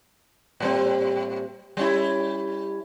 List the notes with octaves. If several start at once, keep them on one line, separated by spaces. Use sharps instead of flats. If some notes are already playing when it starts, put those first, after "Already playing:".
A2 G3 C4
G3 C#4 E4